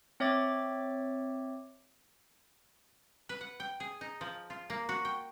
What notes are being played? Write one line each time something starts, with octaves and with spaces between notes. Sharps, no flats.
C4 C#5 E5 D6 A6
B4
F#5
G5
G#4
D#4
F3
F4
A#3
F#4
G5